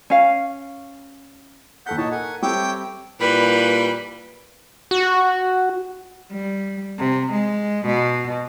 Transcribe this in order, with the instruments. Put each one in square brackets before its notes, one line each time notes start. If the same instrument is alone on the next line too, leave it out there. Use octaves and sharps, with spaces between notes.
[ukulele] C#4 F5
[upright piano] D#2 A4 B6 [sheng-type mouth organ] F#5 G6
[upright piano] A#2 D#4 [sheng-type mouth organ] C#5 D#5 A5
[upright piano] A4 A#4 [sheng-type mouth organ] F#5 G#5
[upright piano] G3 C4 A4 [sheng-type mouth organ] C#5 E5 D6 [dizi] G5
[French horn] A#2 [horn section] E3 G3 [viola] B4 [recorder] B5
[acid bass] F#4
[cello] G3
C3
G#3
B2